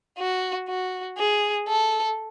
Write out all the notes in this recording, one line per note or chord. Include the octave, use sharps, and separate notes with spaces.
F#4
F#4
G#4
A4